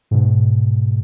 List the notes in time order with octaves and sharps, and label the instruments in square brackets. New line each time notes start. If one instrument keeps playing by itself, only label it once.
[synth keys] G#2 B2